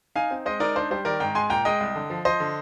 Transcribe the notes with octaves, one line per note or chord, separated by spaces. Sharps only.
D#4 F5 G#5
C4
G#3 C5 D#5
D#4 A#4 D5
D4 C5
G3 C5
D#3 A#4 D5
G#2 G5 A#5
G#3 G#5 C6
A#2 G5 A#5
G#3 D#5 G5
C2
D3
F3
F3 C5 D#5
D3